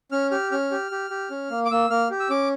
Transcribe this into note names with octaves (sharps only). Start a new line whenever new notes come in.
C#4 F6
G4 F6
C#4 F6
G4
G4
G4
C#4
A#3
D6
A#3 E6
A#3 F6
G4
E6
C#4 D6